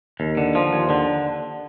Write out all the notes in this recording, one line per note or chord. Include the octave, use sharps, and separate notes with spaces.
D#2
D3
F3
D#2
D3